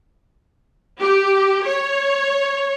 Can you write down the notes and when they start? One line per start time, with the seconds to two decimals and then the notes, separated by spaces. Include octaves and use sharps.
0.99 G4
1.64 C#5